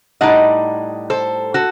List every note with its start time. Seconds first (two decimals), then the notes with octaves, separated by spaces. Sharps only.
0.21 A2 G3 D#4 D#5 F#5
1.10 A4 C5
1.54 F#4 A4